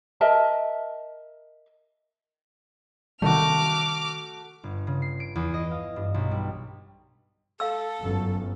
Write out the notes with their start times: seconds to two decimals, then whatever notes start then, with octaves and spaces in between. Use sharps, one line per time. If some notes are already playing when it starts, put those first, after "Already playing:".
0.21 A#4 D#5 E5 A5
3.22 C3 D#3 G3 A3 F#4 D6 F6
4.64 G1
4.87 C#3
5.02 C7
5.20 D7
5.36 E2
5.54 D#5
5.71 F5
5.96 G2
6.14 B1
6.31 G3
7.60 A4 F5 E6
8.01 G1 F#2